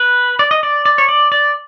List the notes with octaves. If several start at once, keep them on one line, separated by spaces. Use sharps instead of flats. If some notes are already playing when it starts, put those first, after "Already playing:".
Already playing: B4
D5
D#5
D5
D5
C#5
D5
D5